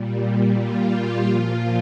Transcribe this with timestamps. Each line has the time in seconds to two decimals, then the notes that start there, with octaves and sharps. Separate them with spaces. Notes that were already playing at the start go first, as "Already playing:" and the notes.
Already playing: A#2 G3
0.53 F4
0.89 G4
1.25 A#2 F3 F4